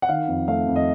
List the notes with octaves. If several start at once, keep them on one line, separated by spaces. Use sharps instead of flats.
F#5
D#3 F5
F2
A3 F5
F2
D#5